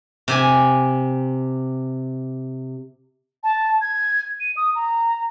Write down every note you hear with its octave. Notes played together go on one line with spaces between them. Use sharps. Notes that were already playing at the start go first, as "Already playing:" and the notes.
C3 G4 G#5
A5
G#6
D#7
D#6
A#5